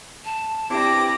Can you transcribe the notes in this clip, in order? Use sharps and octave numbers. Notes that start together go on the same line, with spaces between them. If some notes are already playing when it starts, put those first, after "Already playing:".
A5
C4 D4 E4 G4 B4 D6 A#6